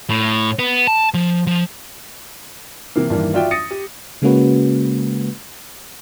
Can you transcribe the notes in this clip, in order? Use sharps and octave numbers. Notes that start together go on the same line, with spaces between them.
A2
B3
A5
F3
F3
C3 E3 A#3
G2 D#3 E3 A#3
F4 F#4 D5 E5 F#5 G5
D#6 A6 A#6 C#7
G4
C#3 G#3 A#3 C#4 F#4 B4